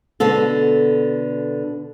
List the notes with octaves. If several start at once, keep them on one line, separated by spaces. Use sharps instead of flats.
B2 D3 A4